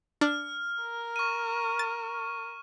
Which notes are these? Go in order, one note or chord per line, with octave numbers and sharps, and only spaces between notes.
D4 F6
A#4
C#6 D#7
A6